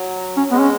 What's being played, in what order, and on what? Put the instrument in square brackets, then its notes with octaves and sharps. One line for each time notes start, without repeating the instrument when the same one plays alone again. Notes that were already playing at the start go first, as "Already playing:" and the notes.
Already playing: [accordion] F#3
[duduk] C#4
[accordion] G#3 [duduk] B3
[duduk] C#4